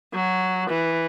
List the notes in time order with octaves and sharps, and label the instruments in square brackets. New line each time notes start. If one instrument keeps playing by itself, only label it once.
[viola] F#3
E3